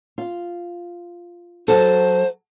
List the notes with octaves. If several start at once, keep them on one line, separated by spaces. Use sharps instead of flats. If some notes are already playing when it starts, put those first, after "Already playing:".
F4
F#3 F#4 A4 C5